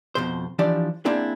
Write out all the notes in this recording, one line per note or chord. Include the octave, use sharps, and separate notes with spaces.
F2 B2 C5
E3 F3 D4 G4 D5
A#3 C4 D4 E4 G#4